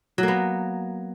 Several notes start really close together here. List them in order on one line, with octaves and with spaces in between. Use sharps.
F#3 A#3 B3